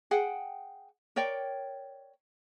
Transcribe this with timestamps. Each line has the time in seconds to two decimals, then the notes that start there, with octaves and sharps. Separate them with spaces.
0.11 G#4 F#5 G5
1.16 A#4 C#5 D5 G5